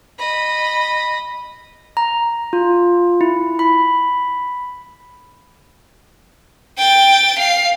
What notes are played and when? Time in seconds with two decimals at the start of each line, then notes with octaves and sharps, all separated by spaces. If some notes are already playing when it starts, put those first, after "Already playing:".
0.18 D#5 B5
1.97 A#5
2.53 F4
3.21 E4
3.59 B5
6.77 G5 A6
7.38 F5 C7